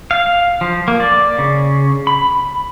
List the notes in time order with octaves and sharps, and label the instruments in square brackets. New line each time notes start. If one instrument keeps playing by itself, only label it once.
[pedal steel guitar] F5
F3
A#3
D5
C#3
B5